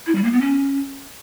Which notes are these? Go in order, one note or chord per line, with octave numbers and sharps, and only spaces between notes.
E4
G3
A#3
B3
C#4